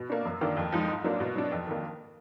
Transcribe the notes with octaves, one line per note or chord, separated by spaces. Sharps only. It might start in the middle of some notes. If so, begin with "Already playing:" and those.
Already playing: B2
A#3 D4
F#2
D#3 A#3 D4
F2
F3 G#3 D#4
G#2
F#3 A#3 D4
B2
F#3 D4
F2
D#3 A#3